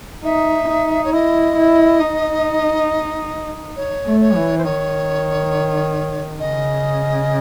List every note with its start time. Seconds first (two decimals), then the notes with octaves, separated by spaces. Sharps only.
0.24 D#4 E5
0.69 D#4
1.05 C#5
1.13 E4 D#5
1.57 E4
2.01 D#4
3.76 C#5
4.06 A3
4.20 C#5
4.35 E3
4.58 C5
4.65 D#3 C#5
6.40 C#3 D#5